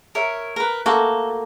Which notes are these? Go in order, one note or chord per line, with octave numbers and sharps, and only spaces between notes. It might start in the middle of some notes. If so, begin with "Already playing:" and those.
A#4 C#5 E5
A#4 B4
A3 A#3 F#4 A4